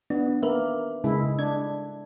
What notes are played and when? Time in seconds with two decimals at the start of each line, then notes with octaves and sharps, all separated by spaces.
0.10 B3 D4
0.43 A#3 A#4 B4 E5
1.04 C#3 G#3 E4
1.39 D4 G#6